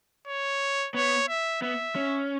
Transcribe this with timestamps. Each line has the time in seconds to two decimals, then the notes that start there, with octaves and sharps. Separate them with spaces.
0.27 C#5
0.94 B3 C#5
1.28 E5
1.62 B3 E5
1.95 C#4